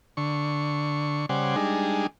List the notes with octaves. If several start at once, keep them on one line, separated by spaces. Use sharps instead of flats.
D3 C#6
C#3 G3 C5 D5 F#5 G#5
G3 G#3 D4 D#4 G#4